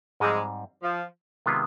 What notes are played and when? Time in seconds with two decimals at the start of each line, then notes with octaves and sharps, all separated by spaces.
0.20 G#2 F3 G3 G#3 C4
0.83 F3
1.46 C3 D#3 G#3 B3 F4